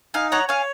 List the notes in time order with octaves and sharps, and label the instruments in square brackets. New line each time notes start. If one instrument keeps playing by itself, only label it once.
[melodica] D#4 [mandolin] F5 G#5
[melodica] C#5 [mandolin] F#5 A#5
[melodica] C#5 [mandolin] F5 G#5